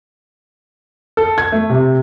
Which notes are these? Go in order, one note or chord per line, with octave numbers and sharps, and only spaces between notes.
A4
G#6
A3
C3